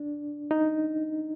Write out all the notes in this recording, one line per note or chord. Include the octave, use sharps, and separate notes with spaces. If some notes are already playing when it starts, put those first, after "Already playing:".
Already playing: D4
D#4